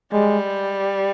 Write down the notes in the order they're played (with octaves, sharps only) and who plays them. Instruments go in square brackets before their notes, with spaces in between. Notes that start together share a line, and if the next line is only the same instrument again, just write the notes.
[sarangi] G3 [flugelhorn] G#3